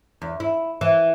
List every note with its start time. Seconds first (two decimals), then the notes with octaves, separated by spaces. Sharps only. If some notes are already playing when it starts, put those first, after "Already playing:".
0.22 E2
0.40 E4
0.81 E3